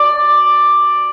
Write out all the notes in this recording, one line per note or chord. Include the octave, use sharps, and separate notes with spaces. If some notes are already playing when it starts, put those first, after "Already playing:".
Already playing: D5